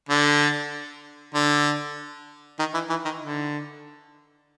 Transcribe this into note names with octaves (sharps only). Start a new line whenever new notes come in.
D3
D3
D#3
E3
E3
D#3
D3